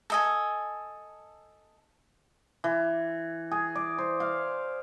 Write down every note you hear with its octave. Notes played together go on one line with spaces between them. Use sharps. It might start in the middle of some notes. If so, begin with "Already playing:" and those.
A4 D#5 G#5
E3
G#4
D5
C5
F5